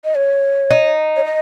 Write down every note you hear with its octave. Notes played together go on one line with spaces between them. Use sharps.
D#5
C#5
D#4
C#5
D#5